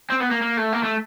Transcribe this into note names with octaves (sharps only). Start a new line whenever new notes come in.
C4
B3
A#3
A#3
A3
A#3
A3